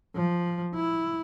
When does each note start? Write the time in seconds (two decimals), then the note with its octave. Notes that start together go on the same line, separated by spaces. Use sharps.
0.15 F3
0.74 E4